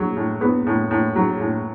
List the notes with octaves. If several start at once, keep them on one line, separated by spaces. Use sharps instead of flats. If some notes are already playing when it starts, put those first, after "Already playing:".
Already playing: F#3
A2
B3
A2
A2
F#3
A2